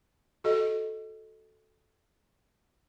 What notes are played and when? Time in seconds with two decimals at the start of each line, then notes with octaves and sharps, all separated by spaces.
0.44 F#4 A4 D#5